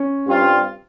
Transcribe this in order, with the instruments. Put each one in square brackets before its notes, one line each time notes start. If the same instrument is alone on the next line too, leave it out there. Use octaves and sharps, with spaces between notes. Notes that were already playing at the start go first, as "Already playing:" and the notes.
Already playing: [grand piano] C#4
[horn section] G2 G3 C4 F4